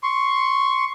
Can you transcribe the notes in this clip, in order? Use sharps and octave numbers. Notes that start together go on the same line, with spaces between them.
C6 C#6